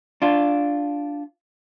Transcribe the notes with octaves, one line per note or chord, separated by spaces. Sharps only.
D4 F4